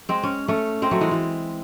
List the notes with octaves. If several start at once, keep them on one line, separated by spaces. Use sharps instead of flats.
G#3 C4
C#4
A3 C#4
G#3 C4
F#3 A3
E3 G#3
E3